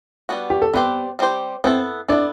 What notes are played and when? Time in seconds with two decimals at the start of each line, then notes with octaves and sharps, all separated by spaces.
0.29 G3 B3 D4 F#4
0.50 G4
0.62 A4
0.73 G3 B3 C4 G4 B4 C5
1.19 G3 C4 G4 C5
1.64 B3 C4 E4 A4 C5
2.08 B3 D4 E4 A4 D5